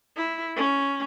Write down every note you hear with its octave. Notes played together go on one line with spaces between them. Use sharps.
E4
C#4